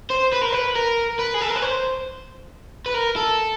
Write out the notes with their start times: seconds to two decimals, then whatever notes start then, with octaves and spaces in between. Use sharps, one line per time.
0.10 C5
0.33 B4
0.42 A#4
0.52 B4
0.75 A#4
1.19 B4
1.34 G#4
1.41 A4
1.49 A#4
1.56 B4
1.63 C5
2.86 B4
2.94 A#4
3.16 A4